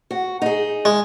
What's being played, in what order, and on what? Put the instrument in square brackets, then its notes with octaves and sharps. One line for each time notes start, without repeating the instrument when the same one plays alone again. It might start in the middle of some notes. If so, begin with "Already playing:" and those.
[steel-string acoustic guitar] F#4
D#4 G#4
[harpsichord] G#3